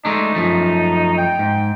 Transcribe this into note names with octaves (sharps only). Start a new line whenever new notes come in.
G#3 A3 D4 D#4
F#2 F3 A3
G5
G#2